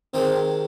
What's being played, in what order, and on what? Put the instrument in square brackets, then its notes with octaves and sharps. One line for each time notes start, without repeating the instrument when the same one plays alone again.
[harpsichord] C3 D#3 G#3 [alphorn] C4